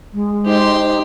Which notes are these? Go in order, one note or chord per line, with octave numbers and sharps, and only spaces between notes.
G#3
D#4 G4 C5 C6